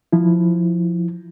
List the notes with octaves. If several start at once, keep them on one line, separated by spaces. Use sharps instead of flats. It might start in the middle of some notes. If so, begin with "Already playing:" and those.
F3 E4